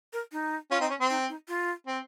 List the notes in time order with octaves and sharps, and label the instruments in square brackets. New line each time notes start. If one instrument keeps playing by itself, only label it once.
[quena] A#4
D#4
[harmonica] C#4 F4
C4 D#4
C#4
C4
[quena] D#4
D#4
F4
[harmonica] C4